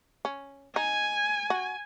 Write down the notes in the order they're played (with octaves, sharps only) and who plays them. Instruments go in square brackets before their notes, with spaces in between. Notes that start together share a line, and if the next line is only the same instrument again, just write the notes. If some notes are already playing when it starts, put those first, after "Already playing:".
[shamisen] C#4
[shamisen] D#4 [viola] G#5
[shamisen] F#4